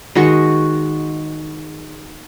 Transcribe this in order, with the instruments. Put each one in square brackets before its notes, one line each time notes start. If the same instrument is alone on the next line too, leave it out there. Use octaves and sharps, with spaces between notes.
[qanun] D#3 G#3 F#4 C#6